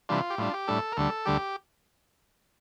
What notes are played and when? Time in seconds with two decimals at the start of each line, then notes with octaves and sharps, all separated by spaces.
0.09 C3 E3 G3 D4 F4
0.30 G4
0.38 A2 G3 D4 F4
0.54 G4
0.67 A2 G3 D4 A4
0.92 A#4
0.97 D2 D3 G3 A4
1.26 D2 D3 G3 G4